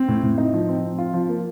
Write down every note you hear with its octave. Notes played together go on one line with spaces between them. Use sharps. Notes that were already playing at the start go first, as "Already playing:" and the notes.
Already playing: C4
A2
A2
D#4
F3
C4
F3
F4
F3
A#3